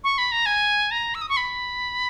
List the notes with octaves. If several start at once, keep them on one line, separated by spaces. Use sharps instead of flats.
C#6
B5
A#5
G#5
A#5
E6
D#6
C#6
B5